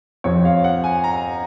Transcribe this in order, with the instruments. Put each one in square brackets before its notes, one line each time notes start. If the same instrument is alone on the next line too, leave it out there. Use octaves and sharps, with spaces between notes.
[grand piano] F2 F3 C#5
F5
F#5
G#5
A#5